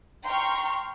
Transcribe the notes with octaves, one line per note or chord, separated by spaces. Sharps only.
G5 A#5 C6 C#6 F6